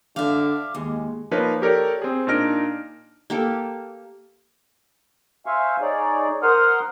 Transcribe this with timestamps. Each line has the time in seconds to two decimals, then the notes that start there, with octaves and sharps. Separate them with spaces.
0.16 D3 E5 F5 D6
0.75 D#2 G#3
1.31 F3 A#3 D#4 B4 C#5
1.62 G4 A4 A#4 C#5 D5
2.02 C4 G#4
2.27 A#2 D4 D#4 F6 A#6 D7
3.30 A#3 G4 A4
5.46 C5 E5 F5 G#5 C#6
5.81 D#4 G#4 C#5 D5
6.43 A#4 C5 F#5 C6 D#6 F6